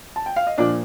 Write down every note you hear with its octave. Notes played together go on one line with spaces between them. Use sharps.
A5
G5
F5
D#5
A#2 F3 A#3 D4 D5